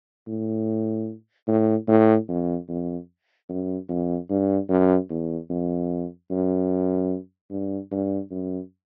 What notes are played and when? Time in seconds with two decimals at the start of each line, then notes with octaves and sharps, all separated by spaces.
0.27 A2
1.48 A2
1.88 A2
2.28 F2
2.69 F2
3.49 F#2
3.89 F2
4.30 G2
4.69 F#2
5.10 E2
5.50 F2
6.31 F#2
7.50 G2
7.91 G2
8.31 F#2